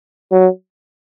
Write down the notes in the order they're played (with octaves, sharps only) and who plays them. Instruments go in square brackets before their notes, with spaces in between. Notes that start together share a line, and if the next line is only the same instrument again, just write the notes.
[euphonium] F#3